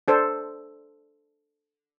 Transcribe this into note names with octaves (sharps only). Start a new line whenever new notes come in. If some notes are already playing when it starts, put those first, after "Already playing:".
D4 A4 C5